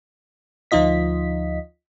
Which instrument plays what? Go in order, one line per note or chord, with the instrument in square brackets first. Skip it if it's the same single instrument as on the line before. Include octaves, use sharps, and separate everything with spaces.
[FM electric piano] D2 F3 D#4 F4 D#5 B6